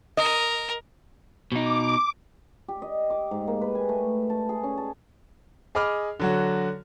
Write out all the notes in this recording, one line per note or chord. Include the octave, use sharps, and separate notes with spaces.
A#4 D#5
B2 D#4 D6
G4
D#5
D6
G#2
A#3
B4
G#5
A3
A5
G#4
C#4
A5
G#4 D#5 B5 D6 F6
D3 F#3 F#4